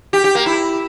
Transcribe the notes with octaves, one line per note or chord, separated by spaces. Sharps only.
G4
G4
A#3
E4